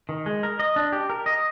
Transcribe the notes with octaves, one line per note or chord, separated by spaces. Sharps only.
D#3
G#3
A#4
D#5
D4
G4
A#4
D#5